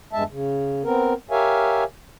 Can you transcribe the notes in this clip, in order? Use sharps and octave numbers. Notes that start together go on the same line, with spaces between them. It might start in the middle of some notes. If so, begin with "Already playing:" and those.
E2 G2 G#3 E5 A5
C#3
B3 C4 A#4
G4 A#4 C#5 E5 F5 G#5